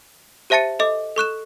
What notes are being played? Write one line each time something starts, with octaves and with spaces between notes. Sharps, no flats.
G4 C5 E5 A5 A6 C#7
A4 D#5 D6
A4 C#6 F#6 E7